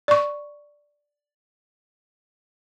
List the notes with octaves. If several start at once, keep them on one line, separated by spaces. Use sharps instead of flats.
D5 C#6